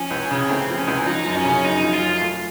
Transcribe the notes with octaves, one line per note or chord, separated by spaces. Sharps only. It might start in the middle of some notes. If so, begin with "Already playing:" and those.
Already playing: F3 C#4
C#2
C#3
A3 C4
F3
C#4
C#2
F3 D#4
F#2
C#4
C#3
F#2 D#4
F3
F4
F#2
A3